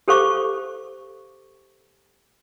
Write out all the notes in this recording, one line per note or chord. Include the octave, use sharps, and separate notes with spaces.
G4 A4 C5 F5 C#6 D6